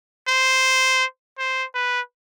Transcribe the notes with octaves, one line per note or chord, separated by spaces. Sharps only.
C5
C5
B4